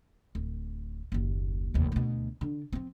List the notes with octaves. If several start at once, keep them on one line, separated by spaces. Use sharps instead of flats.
D1
F#1 D#2
F1 D#2
D2 B2
D3 D4
F3 C4